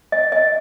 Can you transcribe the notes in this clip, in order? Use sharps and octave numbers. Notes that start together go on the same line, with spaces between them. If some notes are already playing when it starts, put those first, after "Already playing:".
D#5
D#5